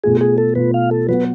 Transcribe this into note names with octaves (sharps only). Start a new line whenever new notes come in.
B2 A3 F4 G#4
G#4
A4
B2 A3 F4 B4
F5
A4
F#3 B3 F#4 B4